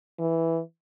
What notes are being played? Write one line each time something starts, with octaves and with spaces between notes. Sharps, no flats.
E3